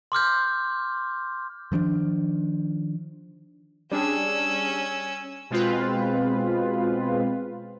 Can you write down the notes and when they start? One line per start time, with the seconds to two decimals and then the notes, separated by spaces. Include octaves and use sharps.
0.12 C6 D6 F6 G6
1.72 D#3 F3 C#4 D4
3.92 G3 C#4 D4 G#4 E6
5.50 B2 G#3 C4 F4 B4